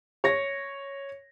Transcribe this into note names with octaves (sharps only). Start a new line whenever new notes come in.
C#5 A#6